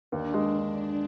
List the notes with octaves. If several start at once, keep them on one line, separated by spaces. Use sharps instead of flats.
D#2 D4
G#3